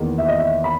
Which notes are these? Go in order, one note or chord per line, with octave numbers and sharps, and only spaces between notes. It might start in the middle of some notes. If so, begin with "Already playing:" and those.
Already playing: E2 D#3 A#3
E5
D#5
E5
B5